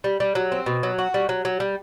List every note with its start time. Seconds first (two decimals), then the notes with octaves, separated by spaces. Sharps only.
0.04 G3
0.20 G3
0.35 F#3
0.52 C4
0.66 B2
0.83 F#3
0.99 F#4
1.14 G3
1.29 F#3
1.45 F#3
1.60 G3